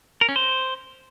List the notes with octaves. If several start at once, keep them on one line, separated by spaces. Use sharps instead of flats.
A#4
C#4
C5